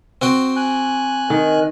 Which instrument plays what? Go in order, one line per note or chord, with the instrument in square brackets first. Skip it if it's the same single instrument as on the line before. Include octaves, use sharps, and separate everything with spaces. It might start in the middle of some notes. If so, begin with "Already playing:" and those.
[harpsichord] C4 F#4 G5
[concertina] G#5 F#6
[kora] D#3 [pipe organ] A#4 D#5